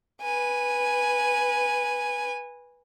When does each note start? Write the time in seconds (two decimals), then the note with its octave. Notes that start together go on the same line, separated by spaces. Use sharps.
0.22 B4 G#5